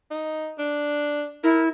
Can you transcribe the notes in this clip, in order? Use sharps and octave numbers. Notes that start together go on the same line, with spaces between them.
D#4
D4
E4 A#4